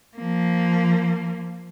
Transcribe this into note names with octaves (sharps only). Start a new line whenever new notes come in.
F3 A#3